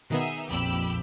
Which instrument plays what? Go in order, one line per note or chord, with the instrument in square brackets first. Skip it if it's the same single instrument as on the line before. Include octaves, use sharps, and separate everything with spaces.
[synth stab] B2 D#3 B3 [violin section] D#4 G#4 E5
[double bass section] A#1 F2 [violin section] G4 B5 E6